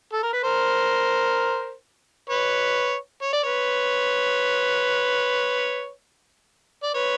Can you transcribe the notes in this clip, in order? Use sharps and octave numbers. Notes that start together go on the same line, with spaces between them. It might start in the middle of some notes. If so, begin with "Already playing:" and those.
A4
A#4
B4
A#4 C5
B4 C#5
C#5
D5
B4 C#5
D5
B4 C#5